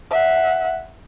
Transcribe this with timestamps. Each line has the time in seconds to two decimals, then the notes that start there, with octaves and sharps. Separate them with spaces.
0.11 E5 F#5